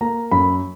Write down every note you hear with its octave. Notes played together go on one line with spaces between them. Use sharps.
A#3 A#5
F#2 B5